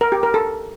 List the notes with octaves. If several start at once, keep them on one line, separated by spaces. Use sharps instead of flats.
A#4
G4
A#4
A4